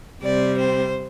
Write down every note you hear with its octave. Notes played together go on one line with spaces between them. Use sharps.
C3 G3 C4 D5
C5